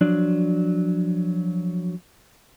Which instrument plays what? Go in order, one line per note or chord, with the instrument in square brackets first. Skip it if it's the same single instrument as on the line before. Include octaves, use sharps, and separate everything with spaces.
[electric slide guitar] F3 F#3 D4 D5